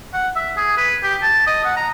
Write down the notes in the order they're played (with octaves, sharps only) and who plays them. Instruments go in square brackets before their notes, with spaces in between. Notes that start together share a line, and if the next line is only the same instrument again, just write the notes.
[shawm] F#5
E5
G#4
B4
G4
A5
D#5
F#5
A#5